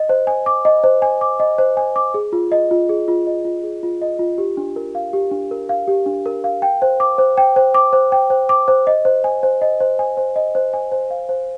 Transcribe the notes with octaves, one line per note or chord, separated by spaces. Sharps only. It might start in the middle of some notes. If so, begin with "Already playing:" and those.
Already playing: D#5
C5
G#5
D6
D#5
C5
G#5
D6
D#5
C5
G#5
D6
G#4
F4
D#5
F4
G#4
F4
D#5
F4
G#4
F4
D#5
F4
G4
D4
A#4
F5
G4
D4
A#4
F5
G4
D4
A#4
F5
G5
C5
D6
C5
G5
C5
D6
C5
G5
C5
D6
C5
D#5
C5
G#5
C5
D#5
C5
G#5
C5
D#5
C5
G#5
C5
F5
C5